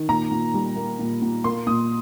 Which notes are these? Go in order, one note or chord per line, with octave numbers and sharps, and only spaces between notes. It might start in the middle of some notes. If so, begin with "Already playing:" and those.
Already playing: D#3
A#2 A#5
A#2
G3
A#3
A#2
A#2
A#3 C6
A#2 D#6